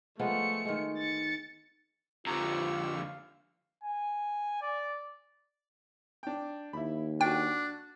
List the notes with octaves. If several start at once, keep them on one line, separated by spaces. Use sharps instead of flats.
F3 G#3 A3 B3 C#7
D#3 G#3
A6 C#7
F2 D3 F4 G4 A#5 C#6 E6
F5
G#5
D5
D4 G5
D#2 E4 B5
D4 F#4 A4 G5